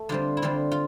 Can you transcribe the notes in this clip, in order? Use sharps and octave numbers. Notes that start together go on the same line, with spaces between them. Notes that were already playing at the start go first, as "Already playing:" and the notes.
Already playing: A3
D3 G3 C4 F4
E4
D3 G3 C4 F4
F4